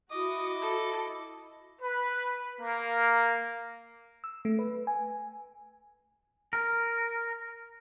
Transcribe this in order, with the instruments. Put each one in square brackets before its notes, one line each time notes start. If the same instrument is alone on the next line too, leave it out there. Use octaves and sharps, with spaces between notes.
[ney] E4 [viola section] F#4 [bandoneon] D#5 D6 [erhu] D#6
[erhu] A4
[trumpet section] B4
A#3
[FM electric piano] E6
A3
B4
G#5
[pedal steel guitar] A#4